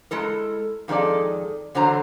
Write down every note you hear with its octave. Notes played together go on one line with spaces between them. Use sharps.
G#3 E4 A4 A#4
F2 D#3 G#3 A4 D5
E2 D3 F#3 C5 A#5